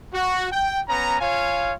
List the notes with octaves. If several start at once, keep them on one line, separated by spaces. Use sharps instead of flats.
F#4
G5
B3 C#4 A#5
F4 C#5 F5 G#5